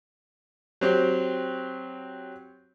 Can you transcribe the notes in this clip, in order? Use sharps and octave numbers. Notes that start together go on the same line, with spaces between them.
F#3 C4 G4